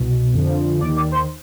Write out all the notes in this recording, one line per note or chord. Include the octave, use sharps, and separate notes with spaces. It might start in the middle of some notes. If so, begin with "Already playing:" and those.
Already playing: C2 B2
F2 D3 F3
D#2 D#3 D5
D5
C5